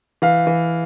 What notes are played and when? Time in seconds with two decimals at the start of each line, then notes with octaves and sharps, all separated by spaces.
0.22 E3 F5
0.47 E3